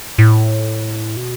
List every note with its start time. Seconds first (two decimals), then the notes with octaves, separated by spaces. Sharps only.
0.18 A2
1.17 B2